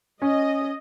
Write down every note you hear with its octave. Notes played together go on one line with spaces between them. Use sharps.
C#4 D#5